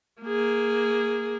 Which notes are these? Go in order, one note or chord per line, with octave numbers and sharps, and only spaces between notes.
A#3 G#4